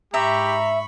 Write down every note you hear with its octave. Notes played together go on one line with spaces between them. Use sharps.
G#2 G4 E5 A#5 B5 C#6